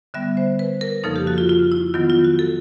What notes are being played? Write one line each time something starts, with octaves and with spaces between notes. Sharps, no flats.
D3 G3 B3 E5
C5
B4
A#4
F2 C#3 F3 A#3 D#4 A4
G4
F#4
F4
F4
E4
D#3 F#3 B3 E4 F4
F4
F#4
A4